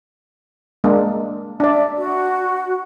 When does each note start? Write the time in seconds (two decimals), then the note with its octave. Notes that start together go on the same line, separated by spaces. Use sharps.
0.84 G#3 A#3 D4
1.60 D4 D5 E5
1.96 F#4